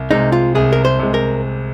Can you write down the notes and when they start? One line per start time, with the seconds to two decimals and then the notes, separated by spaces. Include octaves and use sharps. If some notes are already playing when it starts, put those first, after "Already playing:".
Already playing: C2
0.11 C3 G#3 D#4
0.32 F4
0.55 C2 G#4
0.73 A#4
0.85 C5
0.99 C3 G#3
1.14 A#4